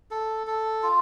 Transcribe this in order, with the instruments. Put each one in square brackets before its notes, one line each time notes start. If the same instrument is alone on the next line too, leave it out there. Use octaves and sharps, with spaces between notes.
[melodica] A4
A4
F4